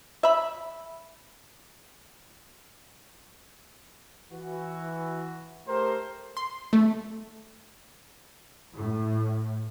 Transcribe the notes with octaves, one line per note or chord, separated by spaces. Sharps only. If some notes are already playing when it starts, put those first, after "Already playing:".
E5 B5
E3 F#4
A3 G4 A#4 C5
C6
A3
A2